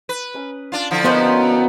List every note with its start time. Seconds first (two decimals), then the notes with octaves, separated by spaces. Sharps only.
0.09 B4
0.34 C#4 D#6
0.72 D4 F4
0.91 D3 F3 E4
1.04 A#3 B3 C#4 F#4 C5 D#5 D6